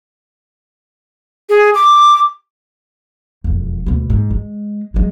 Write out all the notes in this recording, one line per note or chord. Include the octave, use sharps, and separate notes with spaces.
G#4
D6
E1 F2
D2 B2
G#2
G#3
F#3 G#3